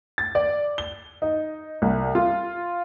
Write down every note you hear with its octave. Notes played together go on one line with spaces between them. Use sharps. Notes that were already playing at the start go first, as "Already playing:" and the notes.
A6
D5
G7
D#4
C2
F4